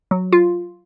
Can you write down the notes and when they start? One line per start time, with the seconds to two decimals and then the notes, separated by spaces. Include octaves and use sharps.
0.11 F#3
0.33 F4